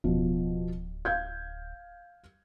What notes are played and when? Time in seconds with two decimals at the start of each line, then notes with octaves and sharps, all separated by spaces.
0.04 D1 B2 F3
1.05 F5 G6 G#6